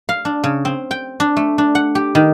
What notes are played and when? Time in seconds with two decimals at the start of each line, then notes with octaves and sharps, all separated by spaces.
0.09 F5
0.25 D4
0.44 C#3
0.65 C4
0.91 G5
1.20 D4
1.37 A3
1.58 D4
1.75 F#5
1.95 G4
2.15 D#3